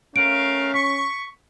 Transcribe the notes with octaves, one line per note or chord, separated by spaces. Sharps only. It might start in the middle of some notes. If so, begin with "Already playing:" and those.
A3 C#4 A#4 F5 D7
C#6 B6